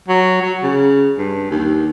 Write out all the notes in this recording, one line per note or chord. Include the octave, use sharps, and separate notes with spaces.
F#3
F#3
C#3
G2
D#2